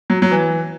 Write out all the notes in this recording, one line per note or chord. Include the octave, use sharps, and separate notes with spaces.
F#3
F#3
E3